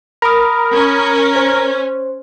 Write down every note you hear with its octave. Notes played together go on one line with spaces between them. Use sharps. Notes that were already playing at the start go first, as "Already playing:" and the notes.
A#4 B5 D#6
C#4
C5